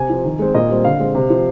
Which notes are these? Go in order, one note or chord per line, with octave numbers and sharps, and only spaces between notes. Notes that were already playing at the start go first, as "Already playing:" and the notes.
Already playing: C3 G#5
F3 C4
D#3
G#3 C4
A#2 D#5
G3 C4
D3 F5
G#3 C4
C3
F3 C4